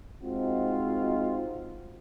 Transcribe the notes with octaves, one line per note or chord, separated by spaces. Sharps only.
G#3 C4 D#4 F4 F#4